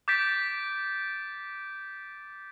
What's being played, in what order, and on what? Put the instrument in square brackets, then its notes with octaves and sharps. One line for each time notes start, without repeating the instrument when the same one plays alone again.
[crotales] D6 G6 A6 B6 D7